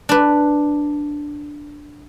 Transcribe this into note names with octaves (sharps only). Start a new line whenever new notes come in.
D4 B4